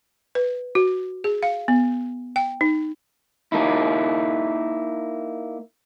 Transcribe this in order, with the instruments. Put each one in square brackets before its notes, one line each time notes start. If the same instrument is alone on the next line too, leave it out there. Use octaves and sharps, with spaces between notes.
[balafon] B4
F#4
G#4
F5
B3
G5
D#4
[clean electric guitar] A#3 D#4 E4